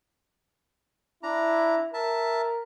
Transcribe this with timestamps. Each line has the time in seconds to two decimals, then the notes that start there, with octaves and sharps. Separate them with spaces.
1.23 D4 E4 A#5
1.94 A#4 E5 A5